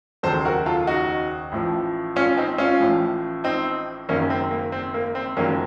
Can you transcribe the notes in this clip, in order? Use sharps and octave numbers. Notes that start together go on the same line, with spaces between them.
F1 D#2 C#3 F#3 A4 C5
F#4 A#4
F4 A4
D#4 F#4
A1 A2 F3
C#4 F4
C4 D#4
C#4 F4
A1 A2 F3
C4 D#4
F#1 F#2 D#3 F#3 A#3 C#4
C4
A#3
C4
A#3
C4
F#1 F2 D#3 F#3 A#3 C#4